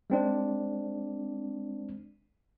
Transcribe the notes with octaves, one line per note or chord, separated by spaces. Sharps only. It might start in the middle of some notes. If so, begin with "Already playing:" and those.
G#3 C4 D4